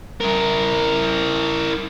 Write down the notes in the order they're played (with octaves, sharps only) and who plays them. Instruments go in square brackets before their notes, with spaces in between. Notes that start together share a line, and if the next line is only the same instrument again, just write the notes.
[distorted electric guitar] E4 A#4